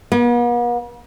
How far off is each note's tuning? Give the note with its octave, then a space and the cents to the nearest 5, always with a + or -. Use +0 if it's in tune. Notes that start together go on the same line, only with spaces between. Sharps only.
B3 -45